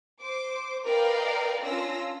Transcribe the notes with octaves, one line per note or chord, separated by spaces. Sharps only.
C5 D6
A#4 B4 D5 D#5 F5 G5
C#4 D4 F4 E6 A#6